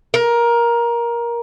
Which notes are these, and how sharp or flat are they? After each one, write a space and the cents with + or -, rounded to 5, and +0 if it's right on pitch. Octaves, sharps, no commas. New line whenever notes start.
A#4 +15